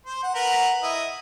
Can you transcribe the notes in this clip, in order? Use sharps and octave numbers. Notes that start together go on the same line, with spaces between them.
C5
F#5
A#4 B4 F#5
E4 D#5